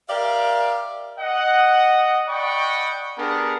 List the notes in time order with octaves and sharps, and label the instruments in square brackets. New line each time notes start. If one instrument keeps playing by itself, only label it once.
[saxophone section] G4 A#4 D5 E5 F5
[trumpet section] D#5 F#5
D5 D#5 F#5 G5 B5 C#6
B3 D4 G4 G#4 A#4